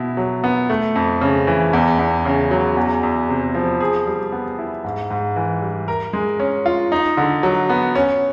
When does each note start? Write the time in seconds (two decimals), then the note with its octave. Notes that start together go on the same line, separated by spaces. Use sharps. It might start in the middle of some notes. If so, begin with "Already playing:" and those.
Already playing: B2 E4
0.17 F#3
0.44 B3
0.70 A3
0.96 F2
1.21 C#3
1.47 E3
1.73 E2
1.99 E2
2.25 C#3
2.51 F#3
2.77 E2
3.03 E2
3.29 C3
3.54 F3
3.81 G#4
4.07 G3
4.32 B3
4.58 E4
4.84 G#2
5.10 G#2
5.36 E3
5.62 G3
5.88 A#4
6.13 G#3
6.40 C#4
6.66 F4
6.92 D#4
7.17 D3
7.43 F#3
7.69 B3
7.95 C#4